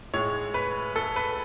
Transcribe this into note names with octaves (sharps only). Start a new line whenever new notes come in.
A2 G#3 C#5
B4
A4
B4